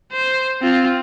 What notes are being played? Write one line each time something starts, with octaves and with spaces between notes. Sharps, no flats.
C5
C4 F4